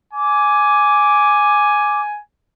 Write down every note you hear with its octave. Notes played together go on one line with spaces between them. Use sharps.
G#5 D6